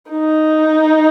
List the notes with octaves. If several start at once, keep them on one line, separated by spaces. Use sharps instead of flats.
D#4